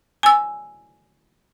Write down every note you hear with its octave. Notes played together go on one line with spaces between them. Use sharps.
G#5 E6